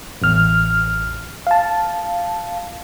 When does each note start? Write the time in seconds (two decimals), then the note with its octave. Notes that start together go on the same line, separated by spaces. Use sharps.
0.22 A1 E2 F6
1.47 F5 A5